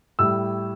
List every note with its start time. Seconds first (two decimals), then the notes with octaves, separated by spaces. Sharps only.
0.19 A2 G3 E6